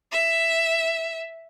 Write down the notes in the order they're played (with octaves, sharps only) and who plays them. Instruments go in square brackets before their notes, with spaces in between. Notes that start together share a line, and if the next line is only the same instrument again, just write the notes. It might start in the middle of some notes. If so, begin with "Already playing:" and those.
[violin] E5